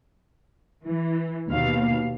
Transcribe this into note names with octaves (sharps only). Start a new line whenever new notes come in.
E3
D#2 B2 F5